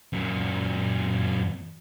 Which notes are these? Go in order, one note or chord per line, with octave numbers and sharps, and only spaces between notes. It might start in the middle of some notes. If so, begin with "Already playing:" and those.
F#2 A#2